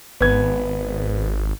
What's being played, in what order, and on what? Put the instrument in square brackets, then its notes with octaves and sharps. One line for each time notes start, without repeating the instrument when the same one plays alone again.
[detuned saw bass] G#1 [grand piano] B3 G#6